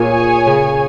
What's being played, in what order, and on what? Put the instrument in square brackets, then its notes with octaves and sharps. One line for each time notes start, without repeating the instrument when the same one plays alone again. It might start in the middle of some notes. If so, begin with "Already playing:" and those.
Already playing: [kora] A#2 [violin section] G#4 C#5 G#5
[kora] C#3